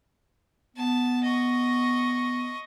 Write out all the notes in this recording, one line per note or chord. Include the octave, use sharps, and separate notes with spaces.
B3 A5
D#5 C#6